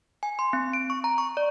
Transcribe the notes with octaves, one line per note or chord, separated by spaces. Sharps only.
G#5
C6
C4
D7
C#6
A#5
C#6
D5